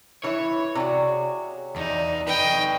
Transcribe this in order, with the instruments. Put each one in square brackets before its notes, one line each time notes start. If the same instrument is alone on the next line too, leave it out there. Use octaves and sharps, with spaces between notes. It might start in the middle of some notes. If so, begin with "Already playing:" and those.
[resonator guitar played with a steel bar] E3 E4 [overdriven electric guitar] C#5
[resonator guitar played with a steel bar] C3 F#4 [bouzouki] G#4 D5
[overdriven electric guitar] E2 [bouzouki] D4 [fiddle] D#4
[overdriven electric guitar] D#4 B4 [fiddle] D#5 G5